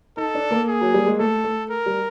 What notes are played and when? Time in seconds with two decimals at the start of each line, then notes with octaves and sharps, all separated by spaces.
0.17 D#4 A4
0.35 D4
0.51 A#3
0.68 G#4
0.81 F#3
0.94 G3
1.07 G#3
1.19 A3 A4
1.44 A3
1.70 A#4
1.86 G3